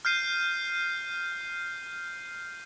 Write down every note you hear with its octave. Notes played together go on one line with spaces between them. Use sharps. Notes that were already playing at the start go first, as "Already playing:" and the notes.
F6 G6 C7 D#7